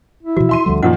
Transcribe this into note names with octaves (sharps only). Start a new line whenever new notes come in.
E4
B2 E3 F3 F#4
E5 C6 D#7
D2 D3 F3 G3
F#2 A#2 D#3 F3 A#3 F#5